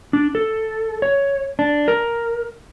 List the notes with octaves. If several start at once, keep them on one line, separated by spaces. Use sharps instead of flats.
D4
A4
C#5
D4
A#4